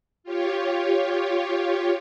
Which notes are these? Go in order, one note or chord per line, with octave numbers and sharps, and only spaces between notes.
F4 G4 C#5